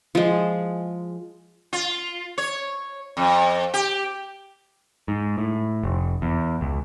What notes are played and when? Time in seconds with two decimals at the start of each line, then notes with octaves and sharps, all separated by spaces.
0.15 F3 G#3
1.73 F4
2.38 C#5
3.17 F2
3.74 G4
5.08 G#2
5.38 A2
5.83 F1
6.22 E2
6.61 C#2